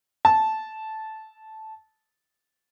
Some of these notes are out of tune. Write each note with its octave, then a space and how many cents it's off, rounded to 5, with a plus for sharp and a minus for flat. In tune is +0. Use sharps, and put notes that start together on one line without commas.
A5 -10